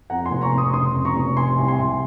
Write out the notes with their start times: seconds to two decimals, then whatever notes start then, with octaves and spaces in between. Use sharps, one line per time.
0.10 F2 F#5 A#5
0.26 G#5 C6
0.31 F1
0.41 A#5 C#6
0.52 F1
0.58 C6 D#6
0.73 C#3 C6 D#6
0.94 F2
1.05 A#5 C#6
1.16 F1
1.37 C3 G#5 C6
1.58 C2
1.68 G#5 C6
1.79 C2